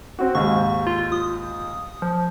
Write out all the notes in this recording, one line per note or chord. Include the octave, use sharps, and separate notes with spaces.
C4 F#4
D#2 G#2 C#6
F4
D#6
F3